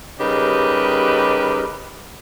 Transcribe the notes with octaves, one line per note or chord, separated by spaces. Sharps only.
C#3 G3 D#4 G4 A#4 B4